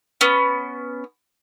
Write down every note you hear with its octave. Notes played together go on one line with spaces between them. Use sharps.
B3 C#4